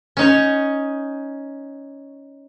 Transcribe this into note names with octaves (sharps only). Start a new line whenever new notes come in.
C#4 D#4 C#5